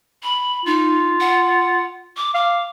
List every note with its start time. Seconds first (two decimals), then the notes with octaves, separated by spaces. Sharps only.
0.22 B5
0.66 D#4 F4
1.20 F#5
2.16 D6
2.34 F5 D6